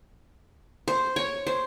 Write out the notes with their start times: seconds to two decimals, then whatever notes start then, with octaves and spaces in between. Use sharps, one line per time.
0.88 C5
1.16 C#5
1.47 C5